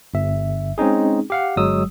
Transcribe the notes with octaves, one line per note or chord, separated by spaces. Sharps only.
G1 E5
G#3 C4 C#4 D#4 G#4
G4 F5 F#5
G1 F#3 G#3 D#6 E6